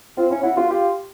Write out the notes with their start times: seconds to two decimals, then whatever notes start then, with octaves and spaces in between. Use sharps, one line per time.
0.17 C4 F4
0.30 C#4 E4
0.43 E4 F#4
0.57 F4 F#4
0.70 F4 G4